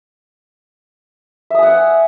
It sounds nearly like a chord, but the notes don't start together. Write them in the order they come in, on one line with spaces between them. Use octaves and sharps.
E5 D#6 G#5 F#5